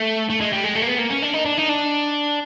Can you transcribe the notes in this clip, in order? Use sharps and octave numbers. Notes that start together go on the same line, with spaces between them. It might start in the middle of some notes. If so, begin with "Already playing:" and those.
Already playing: A3
A3
G#3
G3
G#3
A3
A#3
B3
A#3
C#4
D4
D#4
D4
D#4
D4